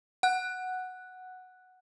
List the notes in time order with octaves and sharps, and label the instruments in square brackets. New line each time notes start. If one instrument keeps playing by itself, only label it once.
[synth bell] F#5 F#6